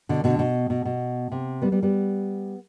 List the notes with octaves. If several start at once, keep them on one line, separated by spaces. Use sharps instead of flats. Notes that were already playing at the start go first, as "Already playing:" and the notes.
B2 D3
B2 D3
B2
B2
B2
C3
G3 B3
G3 B3
G3 B3